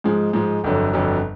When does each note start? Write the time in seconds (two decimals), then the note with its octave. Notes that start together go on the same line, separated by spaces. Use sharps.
0.04 G#2 F3 G#3
0.33 G#2 F3 G#3
0.64 G1 F2 D3 F#3
0.93 G1 F2 D3 F#3